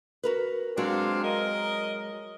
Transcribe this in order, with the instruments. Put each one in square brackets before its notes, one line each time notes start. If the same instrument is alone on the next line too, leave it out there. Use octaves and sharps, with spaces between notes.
[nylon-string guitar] F#4 A#4 B4
[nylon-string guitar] F#3 G#3 F#4 [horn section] C4 D4 F5
[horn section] A#4 D#5